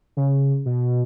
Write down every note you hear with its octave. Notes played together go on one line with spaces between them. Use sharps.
C#3
B2